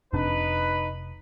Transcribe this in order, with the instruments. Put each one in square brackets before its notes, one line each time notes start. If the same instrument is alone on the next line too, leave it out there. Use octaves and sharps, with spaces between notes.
[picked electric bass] F1 C3 D4 [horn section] D#4 B4